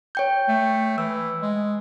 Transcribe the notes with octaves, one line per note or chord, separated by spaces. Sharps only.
C#5 G5 G6
A3
E3 E6
G#3